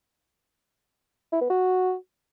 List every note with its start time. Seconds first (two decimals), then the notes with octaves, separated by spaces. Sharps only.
1.32 E4
1.41 B3
1.50 F#4